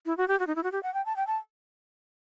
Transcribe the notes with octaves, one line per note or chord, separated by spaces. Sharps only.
E4
F#4
G4
F#4
D#4
E4
F#4
G4
F#5
G5
A5
G5
A5